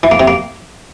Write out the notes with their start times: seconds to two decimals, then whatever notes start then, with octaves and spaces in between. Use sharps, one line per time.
0.03 E3
0.11 A#3
0.20 C3
0.28 A#3